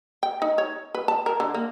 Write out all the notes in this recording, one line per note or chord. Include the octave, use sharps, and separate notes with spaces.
G5
D#4
C#5
B4
A5
A#4
D3
A#3